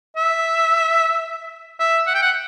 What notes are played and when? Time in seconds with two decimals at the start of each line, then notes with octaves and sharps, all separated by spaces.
0.17 E5
1.80 E5
2.07 F#5
2.15 G5
2.22 F#5